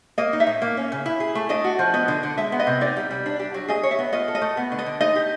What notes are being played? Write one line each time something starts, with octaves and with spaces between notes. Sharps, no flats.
A#3 D#5
D#4
E5
A2
A#3
C#4
C#3
E4
G#4
A3
D4 D#5
F#4
F3
B3 D#5
D3
D3
G#3 E5
B3
D#5
C3
D#4 D5
G3
G3
D4
G4
F#3
G#4 D#5
C#5
E5
B3
F4 D#5
A4
D#5
A3
B3
D3
D#5
D3
D#4 D#5
G4